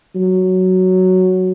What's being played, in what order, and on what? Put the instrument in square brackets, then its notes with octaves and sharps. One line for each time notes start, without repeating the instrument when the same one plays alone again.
[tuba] F#3